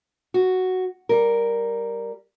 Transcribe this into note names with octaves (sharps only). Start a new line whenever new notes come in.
F#4
G3 A#4